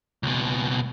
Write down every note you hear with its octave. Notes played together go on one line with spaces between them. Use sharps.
C#2 B2